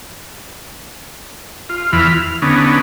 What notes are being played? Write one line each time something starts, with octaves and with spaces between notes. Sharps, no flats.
F4
E2 E3 F4 B5 F6
F6
D3 B3 C#4 D#4